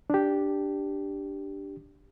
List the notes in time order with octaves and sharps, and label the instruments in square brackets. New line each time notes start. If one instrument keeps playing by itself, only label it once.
[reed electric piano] D4 G4